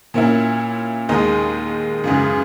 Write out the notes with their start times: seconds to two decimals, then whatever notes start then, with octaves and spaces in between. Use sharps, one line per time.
0.14 A#2 A#3 C#4 E4
1.09 D#2 D#3 G#3 D#4
2.04 F#2 C#3 E3 G#3